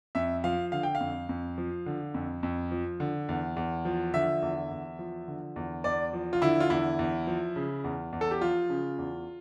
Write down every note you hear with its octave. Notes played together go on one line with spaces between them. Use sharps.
F2 E5
F3 F5
D3 F5
G5
F5
F2
F2
F3
D3
F2
F2
F3
D3
E2
E2
F3
D3 E5
E2
E2
F3
D3
E2
E2 D5
F3
F4
D3 E4
F4
E2 E4
E2
F3
C#3
E2
E2
A4
G4
F3 F4
C#3
E2